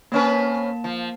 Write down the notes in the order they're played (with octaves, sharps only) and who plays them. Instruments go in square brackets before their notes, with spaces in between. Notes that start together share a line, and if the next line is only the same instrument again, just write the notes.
[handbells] A#3 A5 [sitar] C4 C#4 B4
[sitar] F3